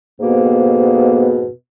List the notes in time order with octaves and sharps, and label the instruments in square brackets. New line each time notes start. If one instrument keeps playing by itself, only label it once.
[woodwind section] F2 G#2 B2 A#3 B3